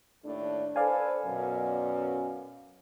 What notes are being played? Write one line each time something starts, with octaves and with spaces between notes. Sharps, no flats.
D#2 A2 D4
A4 B4 C5 D5 F5 G#5
F#2 B2